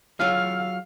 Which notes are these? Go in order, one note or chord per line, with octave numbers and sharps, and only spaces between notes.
F#3 F4 G#4 F5 E6 F6